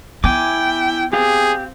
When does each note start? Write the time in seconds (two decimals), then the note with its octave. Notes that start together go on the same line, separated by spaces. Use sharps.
0.24 B3 E4 G5 G#5 D6
1.13 C4 G4 G#4 F5